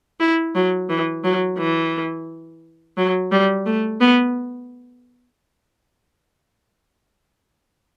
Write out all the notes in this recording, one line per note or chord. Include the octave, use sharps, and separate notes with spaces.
E4
F#3
E3
F#3
E3
F#3
G3
A3
B3